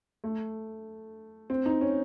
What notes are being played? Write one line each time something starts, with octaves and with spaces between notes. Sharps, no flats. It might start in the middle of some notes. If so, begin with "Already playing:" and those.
A3
C4
D#4
C#4